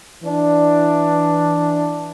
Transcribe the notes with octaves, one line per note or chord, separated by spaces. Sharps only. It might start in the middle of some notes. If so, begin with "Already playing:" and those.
E3 D4